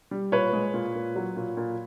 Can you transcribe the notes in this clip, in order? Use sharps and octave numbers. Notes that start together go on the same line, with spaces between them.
G3
A#2 B4 C#5
G#3
A#2
A#2
F#3
A#2
A#2